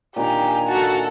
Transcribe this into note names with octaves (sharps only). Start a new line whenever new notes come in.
A#2 D#3 D4 G4 G#5 A#5
F#4 A4 F#5 A5